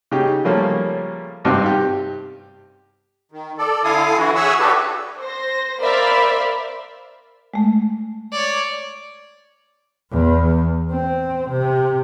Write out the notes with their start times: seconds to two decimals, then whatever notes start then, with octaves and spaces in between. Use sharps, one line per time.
0.11 C#3 D#4 G4
0.45 C#3 F3 G3 A3 A#3 C#4
1.44 G#1 G2 C3 C4 D#4 F5
1.66 G4
3.32 D#3
3.58 A4 D5
3.84 D3 E4 A4 F5 G#5 D#6
4.17 D3 E3 E4 F#4
4.35 G#4 C#5 E5 F#5 G#5 E6
4.59 D4 F#4 G4 A4 B4
5.19 C5 A#6
5.81 A#4 C5 D5 E5 F5 B5
7.54 G#3 A3
8.32 C#5 D5
10.11 E2
10.91 C4
11.50 C3